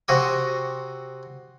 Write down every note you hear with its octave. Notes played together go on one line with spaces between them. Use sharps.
C3 F#4 D#6